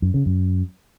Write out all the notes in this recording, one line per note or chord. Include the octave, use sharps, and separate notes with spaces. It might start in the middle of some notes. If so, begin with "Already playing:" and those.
F#2
C#3
F#2